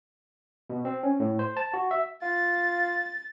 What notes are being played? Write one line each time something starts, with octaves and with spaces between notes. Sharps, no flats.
B2
C4
C#4
A2
C5
A5
F#4
E5
F4 A6